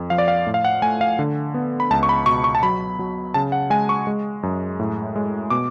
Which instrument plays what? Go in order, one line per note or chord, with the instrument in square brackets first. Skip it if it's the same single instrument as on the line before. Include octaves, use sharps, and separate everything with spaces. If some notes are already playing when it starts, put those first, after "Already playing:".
Already playing: [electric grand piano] F2
F3 F5
D5
F5
A2
F5
F#5
A3 G#5
F5
D3
B3
B5
C#2 A5
C#6
B5
B2 C#6
C#6
A5
F#3 B5
F#3
C#3 A5
F#5
G#3 G#5
C#6
G#3
F#2
A2
G#3
B2 D6